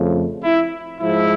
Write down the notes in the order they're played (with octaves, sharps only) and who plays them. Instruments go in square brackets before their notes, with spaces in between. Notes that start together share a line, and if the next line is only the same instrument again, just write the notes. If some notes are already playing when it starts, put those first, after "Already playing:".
Already playing: [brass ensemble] F2 C#3 F3 A3
E4
G#2 F3 G#3 E4